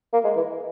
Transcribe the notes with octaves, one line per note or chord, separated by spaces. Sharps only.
A#3
G#3
E3